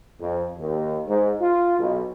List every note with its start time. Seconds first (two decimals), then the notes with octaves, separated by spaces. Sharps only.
0.20 F2
0.58 D#2
1.08 G#2
1.41 F4
1.78 B1